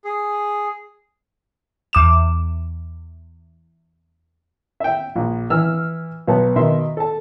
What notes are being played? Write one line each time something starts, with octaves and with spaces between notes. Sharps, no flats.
G#4
E2 D6 E7
E5 G5
A#1
E3 E6 F6
B1 B3 A5
B2 D#3 E5 C6
A4 A5